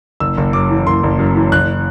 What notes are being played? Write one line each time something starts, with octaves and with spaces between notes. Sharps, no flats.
F#1 E6
F#1
F#2 D6
E3
F#1 C6
F#1
F#2
E3
F#1 F#6